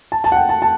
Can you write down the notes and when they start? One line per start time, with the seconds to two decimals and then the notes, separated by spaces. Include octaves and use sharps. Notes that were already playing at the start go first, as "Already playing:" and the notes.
0.12 A5
0.24 A5
0.32 F#5
0.36 G5
0.49 A5
0.62 A5